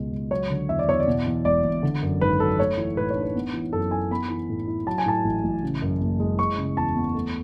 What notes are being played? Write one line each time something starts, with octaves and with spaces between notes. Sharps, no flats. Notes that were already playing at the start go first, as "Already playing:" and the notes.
Already playing: C#2 B2 G#3
C#2
F#3 C#5
D3
E2 E5
D5
E2 C#5
D5
B2
E2
E1 D5
E1
D3
F#2
G#1 B4
F#3 A4
A3 C#5
E3
A2 B4
C#5
D4
B4
B3
E3
F#2 A4
E4 G#5
B3 B5
E3
A2
E4
F#3 A5
G#5
A2 A5
A1
A1
C#3
F#2
F#1
G#3
G#3 C#6
C#3
E2 A5
B3
A3